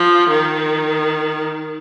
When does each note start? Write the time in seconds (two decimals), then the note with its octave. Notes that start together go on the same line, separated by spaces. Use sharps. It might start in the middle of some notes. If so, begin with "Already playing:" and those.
Already playing: F3
0.29 D#3